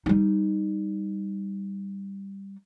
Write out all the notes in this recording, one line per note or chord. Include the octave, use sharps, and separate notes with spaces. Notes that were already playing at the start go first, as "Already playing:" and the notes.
G3 D#4